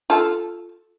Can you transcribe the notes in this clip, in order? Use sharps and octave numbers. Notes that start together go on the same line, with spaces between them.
F4 A4